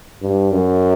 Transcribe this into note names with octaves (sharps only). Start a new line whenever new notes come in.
G2
F#2